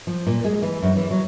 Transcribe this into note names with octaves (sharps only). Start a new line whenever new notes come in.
F3
A#2
G#3
E3
F#2
E3
F#3